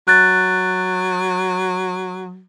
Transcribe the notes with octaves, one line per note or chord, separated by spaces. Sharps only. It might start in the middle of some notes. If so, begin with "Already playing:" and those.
F#3 F#6 A6